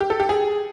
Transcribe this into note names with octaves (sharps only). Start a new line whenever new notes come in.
G4
A4
G4
G#4